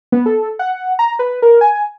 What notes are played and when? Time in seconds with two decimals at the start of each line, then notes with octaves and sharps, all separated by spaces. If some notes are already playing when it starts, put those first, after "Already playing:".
0.12 B3
0.26 A4
0.59 F#5
0.99 A#5
1.19 B4
1.42 A#4
1.61 G#5